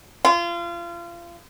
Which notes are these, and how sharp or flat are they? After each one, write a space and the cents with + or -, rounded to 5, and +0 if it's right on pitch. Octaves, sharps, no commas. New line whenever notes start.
F4 -30